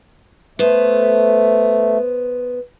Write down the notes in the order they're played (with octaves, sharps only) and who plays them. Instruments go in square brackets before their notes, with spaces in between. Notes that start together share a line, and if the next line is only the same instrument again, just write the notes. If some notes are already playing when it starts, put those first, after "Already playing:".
[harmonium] A3 [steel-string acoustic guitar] B3 C5